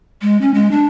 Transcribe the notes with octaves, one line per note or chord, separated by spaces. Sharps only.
G#3
C#4
G#3
D4